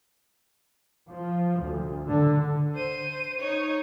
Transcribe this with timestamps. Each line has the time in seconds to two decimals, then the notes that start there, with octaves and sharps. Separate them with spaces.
1.10 F3
1.61 D2
2.09 D3
2.75 C5 D#7
3.40 D#4 C#5